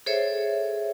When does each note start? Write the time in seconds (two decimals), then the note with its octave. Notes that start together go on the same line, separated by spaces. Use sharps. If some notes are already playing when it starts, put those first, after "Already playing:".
0.06 G#4 A4 C5 C#5 E5